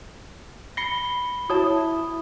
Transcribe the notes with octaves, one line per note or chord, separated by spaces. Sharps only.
B5 A#6 C7 C#7 G7
E4 F#4 C#5 A5 D#6